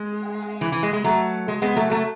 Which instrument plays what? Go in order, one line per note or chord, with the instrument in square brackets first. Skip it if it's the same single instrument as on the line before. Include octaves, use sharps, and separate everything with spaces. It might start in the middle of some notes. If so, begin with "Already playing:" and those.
Already playing: [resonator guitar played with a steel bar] G#3
E3
E3
G#3
G#3
F#3 A3
G#3
G#3 B3
F#3 A3
F#3 A3